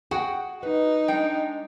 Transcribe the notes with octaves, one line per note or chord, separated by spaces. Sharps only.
F#4 G#4 F#5 G5
D#4 B4
G#3 D4 G5